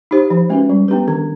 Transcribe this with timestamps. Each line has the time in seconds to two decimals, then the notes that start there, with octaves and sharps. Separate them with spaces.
0.11 D#4 G4 C5
0.30 F3
0.50 G#3 C#4 F#4 B4
0.69 G3
0.88 B3 D4 G4 B4
1.08 D#3